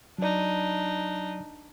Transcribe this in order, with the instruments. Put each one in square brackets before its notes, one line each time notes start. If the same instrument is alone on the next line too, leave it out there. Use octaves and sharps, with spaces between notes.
[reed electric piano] F#3 D5 [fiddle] D4 D#4